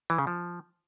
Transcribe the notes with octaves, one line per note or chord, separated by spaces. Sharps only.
E3
C#3
F3